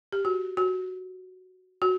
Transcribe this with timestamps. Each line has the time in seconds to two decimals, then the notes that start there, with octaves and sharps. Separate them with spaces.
0.12 G4
0.25 F#4
0.57 F#4
1.82 F#4